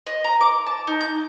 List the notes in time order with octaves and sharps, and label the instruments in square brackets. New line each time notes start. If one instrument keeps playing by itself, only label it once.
[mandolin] D#5
A#5
D6
A5
D#4
G6